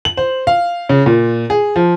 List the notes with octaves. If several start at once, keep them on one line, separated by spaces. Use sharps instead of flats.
F#7
C5
F5
C#3
A#2
G#4
F3